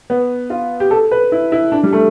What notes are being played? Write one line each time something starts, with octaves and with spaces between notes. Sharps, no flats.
B3
F4
G4
A4
B4
E4
E4
D4
G3
A3